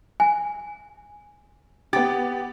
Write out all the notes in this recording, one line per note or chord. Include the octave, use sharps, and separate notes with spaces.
G#5
B3 G4 A6